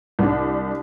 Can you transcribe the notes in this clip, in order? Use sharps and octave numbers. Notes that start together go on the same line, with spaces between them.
C2 D4